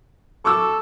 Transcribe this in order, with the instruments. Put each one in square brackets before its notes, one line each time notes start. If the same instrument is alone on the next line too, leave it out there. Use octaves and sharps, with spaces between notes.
[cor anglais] A4 [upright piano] C#6 D6 E6